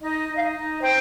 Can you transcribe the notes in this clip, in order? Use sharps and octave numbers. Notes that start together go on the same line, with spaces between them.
D#4 D#5
D#4
F5
D#5
D#4
C5 G5